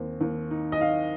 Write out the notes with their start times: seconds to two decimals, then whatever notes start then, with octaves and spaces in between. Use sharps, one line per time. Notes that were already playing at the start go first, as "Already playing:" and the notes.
Already playing: D#2 C4
0.21 D#2
0.51 D#4
0.72 D#5
0.81 D#4 F5